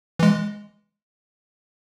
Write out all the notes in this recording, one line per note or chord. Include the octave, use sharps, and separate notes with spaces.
E3 G#3